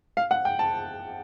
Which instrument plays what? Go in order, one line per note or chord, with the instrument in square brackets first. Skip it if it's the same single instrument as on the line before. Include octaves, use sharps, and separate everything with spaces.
[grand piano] F5
F#5
G5
A5